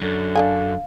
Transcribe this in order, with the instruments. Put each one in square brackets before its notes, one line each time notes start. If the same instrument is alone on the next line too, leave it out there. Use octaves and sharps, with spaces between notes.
[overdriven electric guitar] F#2 [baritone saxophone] D3
[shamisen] D4 A4 G#5 [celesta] F5